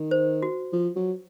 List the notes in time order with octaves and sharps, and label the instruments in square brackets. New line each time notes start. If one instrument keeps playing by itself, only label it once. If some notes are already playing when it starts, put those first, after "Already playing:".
Already playing: [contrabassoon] D#3
[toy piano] C5
F#4
[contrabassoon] F3
F#3